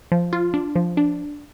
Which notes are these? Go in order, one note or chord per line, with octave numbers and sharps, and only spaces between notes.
F3
F4
D4
F3
D4